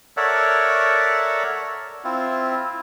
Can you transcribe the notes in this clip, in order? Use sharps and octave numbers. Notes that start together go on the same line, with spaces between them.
A4 A#4 C#5 D5 E5 F#5
C4 E4 F4